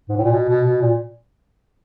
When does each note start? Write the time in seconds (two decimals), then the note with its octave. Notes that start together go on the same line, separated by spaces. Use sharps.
0.09 G#2
0.17 A2
0.24 A#2
0.32 B2
0.49 B2
0.65 B2
0.81 A#2